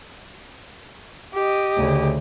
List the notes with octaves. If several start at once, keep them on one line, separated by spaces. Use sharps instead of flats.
G4 D#5
D2 C#3